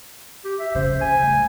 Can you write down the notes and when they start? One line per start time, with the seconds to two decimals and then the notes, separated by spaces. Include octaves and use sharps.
0.44 G4
0.59 E5
0.75 C#3 C5
1.01 G#5
1.22 A3